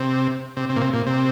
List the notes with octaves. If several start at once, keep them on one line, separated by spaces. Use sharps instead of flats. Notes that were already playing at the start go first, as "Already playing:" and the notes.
Already playing: C3
C3
C3
A#2
C3
A#2
C3